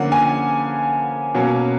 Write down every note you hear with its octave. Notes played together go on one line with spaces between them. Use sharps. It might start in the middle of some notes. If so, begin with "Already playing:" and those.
Already playing: D3 F3 A#3 C#4 F#5
G#5
B2 F#3 A#3 C#4